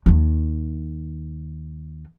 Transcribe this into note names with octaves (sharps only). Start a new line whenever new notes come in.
D#2 D#3